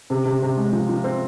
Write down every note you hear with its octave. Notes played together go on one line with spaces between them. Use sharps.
C3
C3
C3
G#3
F3
F3
C4